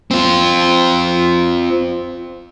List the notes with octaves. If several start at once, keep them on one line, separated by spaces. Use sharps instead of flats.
C4 F4